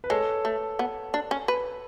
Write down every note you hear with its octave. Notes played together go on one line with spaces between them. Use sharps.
B4
G#3 A4 C#5
A3
B3
D4
C#4
B4